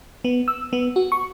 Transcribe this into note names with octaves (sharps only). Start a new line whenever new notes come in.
B3
E6
B3
F#4
C#6